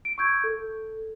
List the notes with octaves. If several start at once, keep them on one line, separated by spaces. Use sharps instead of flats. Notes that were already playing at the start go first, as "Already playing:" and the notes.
D7
C#6 E6 G6 G#6
A4